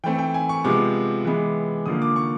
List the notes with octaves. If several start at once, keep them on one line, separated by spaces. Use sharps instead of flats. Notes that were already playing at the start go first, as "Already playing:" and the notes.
E3 A3 C4 G5
G5
G#5
C#6
C3 F3 G#3 B3 D6
E3 G#3 B3
D3 F3 A#3 D#6
D6
C#6